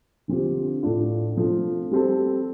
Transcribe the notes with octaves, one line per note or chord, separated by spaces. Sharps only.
D3 F3 C4 G4
A2 A3 D4 F4
F3 A3 C4
G3 C4 A4